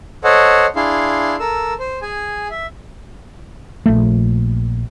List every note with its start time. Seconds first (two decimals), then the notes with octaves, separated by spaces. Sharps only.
0.24 A4 C5 C#5 D#5 F#5
0.76 D4 E4 G#4 F5 C6
1.40 A4 A#4 E6
1.79 C5
2.02 G#4 G#5
2.50 E5
3.86 A#1 A3